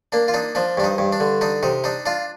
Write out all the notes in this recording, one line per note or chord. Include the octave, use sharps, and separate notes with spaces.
A#3 D4
F4
D4 D#4
F3 D4
G2 D4
D#4
G2
D4
D3
D4 D#4
C3 D#4
D4 D#4
D4 F4